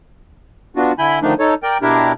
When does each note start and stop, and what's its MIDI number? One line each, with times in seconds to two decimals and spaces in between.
0.76 0.92 59
0.76 0.92 62
0.76 0.92 65
0.76 0.92 66
0.98 1.19 50
0.98 1.19 64
0.98 1.19 80
0.98 1.19 83
0.98 1.19 91
1.22 1.34 50
1.22 1.34 51
1.22 1.34 53
1.22 1.34 57
1.22 1.34 62
1.22 1.34 63
1.39 1.54 63
1.39 1.54 69
1.39 1.54 73
1.63 1.78 70
1.63 1.78 74
1.63 1.78 79
1.82 2.12 47
1.82 2.12 62
1.82 2.12 64
1.82 2.12 67
1.82 2.12 70